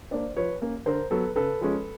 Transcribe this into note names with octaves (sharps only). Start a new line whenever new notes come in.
A#3 D4 C5 D5
F3 B4 C#5
A#3 C#4
D3 A#4 C5
F#3 B3 A4 B4
C#3 A4 B4
F3 G#3 C#4